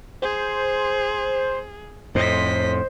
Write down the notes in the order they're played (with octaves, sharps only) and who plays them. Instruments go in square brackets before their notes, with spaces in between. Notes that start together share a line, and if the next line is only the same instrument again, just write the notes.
[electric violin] G#4 [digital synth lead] C5
[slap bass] F2 A2 [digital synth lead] C5 [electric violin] D#5 B6